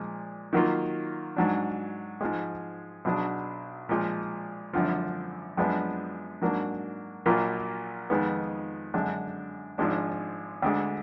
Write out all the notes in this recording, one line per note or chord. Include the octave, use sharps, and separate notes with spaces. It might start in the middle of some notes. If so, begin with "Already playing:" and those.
Already playing: A#2 F3 G#3
D#3 F#3 A#3 F4
G#2 F#3 D4
G#2 F3 G#3
B1 B2 F#3 D4 G#4
A#2 F3 G#3
G#1 F#2 D3 F3
F#2 F3 G#3 B3 D4
G#2 F#3 A#3 D4
A#1 A#2 F#3 A#3 F4
F2 D#3 G#3 B3
F#2 D3 G#3 D4
G#1 G#2 F3 G#3 D4
D2 D3 G#3